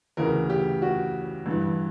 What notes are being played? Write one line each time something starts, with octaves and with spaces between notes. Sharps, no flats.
D2 C#3 E3 A#4
G4
F#4
G2 E3